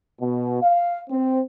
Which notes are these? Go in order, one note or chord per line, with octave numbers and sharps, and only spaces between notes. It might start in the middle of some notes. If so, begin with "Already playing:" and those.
B2
F5
C4